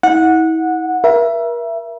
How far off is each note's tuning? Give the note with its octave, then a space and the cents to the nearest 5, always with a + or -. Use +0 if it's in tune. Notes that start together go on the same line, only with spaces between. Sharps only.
E4 -40 F#5 -15
A#4 +40 E5 +20